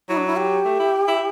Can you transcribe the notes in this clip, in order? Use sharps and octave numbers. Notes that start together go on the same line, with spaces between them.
F#3 E4
D4
E4
G4
A3
E4
E4